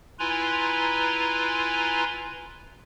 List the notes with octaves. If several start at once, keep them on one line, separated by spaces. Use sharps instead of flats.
E4 F4 B4 G#5 A#5 C6